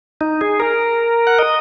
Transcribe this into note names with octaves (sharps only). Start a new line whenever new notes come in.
D#4
G#4
A#4
F#5
D#5